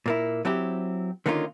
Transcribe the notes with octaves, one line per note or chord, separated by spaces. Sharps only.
A#2 A#3 E4
F#3 C4 E4 G4
D3 D#3 A#3 C#4 D#4 F4